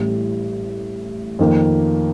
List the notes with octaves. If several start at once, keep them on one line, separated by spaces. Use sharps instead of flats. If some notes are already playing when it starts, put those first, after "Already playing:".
Already playing: A1 A2 G3
F2 D#3 A#3